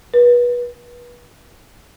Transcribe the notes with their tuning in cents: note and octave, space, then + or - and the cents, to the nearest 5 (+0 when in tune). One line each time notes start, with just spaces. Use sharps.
B4 -30